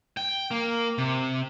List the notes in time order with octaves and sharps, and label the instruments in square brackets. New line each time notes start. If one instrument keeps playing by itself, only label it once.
[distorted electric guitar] G5
A#3
C3